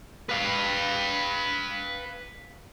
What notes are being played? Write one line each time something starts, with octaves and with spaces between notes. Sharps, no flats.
B4 F5